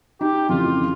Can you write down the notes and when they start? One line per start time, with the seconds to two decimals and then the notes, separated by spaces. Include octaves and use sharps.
0.21 D#4 G4
0.49 F2 C#3 E3 F4